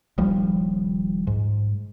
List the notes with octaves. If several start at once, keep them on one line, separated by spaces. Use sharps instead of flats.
D#1 A#1 F3 G3
G#2